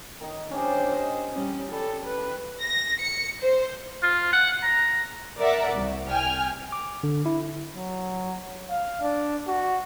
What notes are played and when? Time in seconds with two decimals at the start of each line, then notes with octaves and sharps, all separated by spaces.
0.21 D#3 D#4
0.51 C#4 D4 G4 C5
0.92 D#5
1.33 G3 C#4
1.72 G3 A4
2.06 B4
2.62 A#6
3.00 C#7
3.40 C5
4.03 F4
4.33 F#5
4.63 A#5
5.39 A#4 D5 E5 F#5
5.76 C2
6.08 G5 G#5 F6
6.72 D6
7.03 D3
7.26 E4
7.74 F#3
8.70 F5
9.02 D4
9.48 F#4